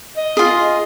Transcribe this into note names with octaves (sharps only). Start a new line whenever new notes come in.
D#5
F4 G#4